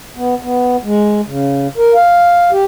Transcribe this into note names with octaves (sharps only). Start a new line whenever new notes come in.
B3
B3
G#3
C#3
A#4
F5
G4